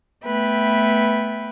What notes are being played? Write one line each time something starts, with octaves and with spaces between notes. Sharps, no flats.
A3 B3 B4 E5 G5